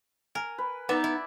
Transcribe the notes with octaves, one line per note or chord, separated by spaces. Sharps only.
A#4 G#5
B4
B3 D#4 D5 E5
E4